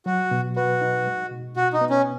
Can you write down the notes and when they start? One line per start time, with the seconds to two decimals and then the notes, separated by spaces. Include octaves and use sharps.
0.06 F#3 F#4
0.31 B2
0.56 F#4 B4
0.81 D#4
1.07 G#3
1.31 B2
1.56 B2 F#4
1.73 D#4
1.81 B3
1.90 C#4